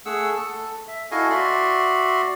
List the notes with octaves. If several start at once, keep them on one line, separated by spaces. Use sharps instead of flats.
A3 G#4 F#5 E6
A4
E5
E4 F#4 A4 D#5 F5 G#5
F#4 D5 E5 C6